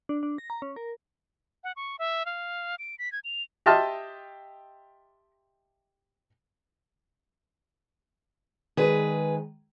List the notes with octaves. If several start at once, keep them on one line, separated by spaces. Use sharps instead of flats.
D4
D4
A#6
A#5
C#4
A#4
F#5
C#6
E5
F5
D7
B6
G#6
F7
G4 D#5 E5 A5 C6 F6
D#3 G#3 G#4 B4